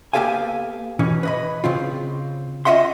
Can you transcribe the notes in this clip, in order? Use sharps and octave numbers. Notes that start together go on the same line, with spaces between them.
A#3 B3 G4 A4 F5 G#5
B2 E3 C#4
B4 D#5 B5
C#3 C4 F4
C#4 F4 D#5 E5 F#5 C6